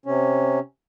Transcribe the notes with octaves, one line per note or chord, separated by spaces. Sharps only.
C3 C#4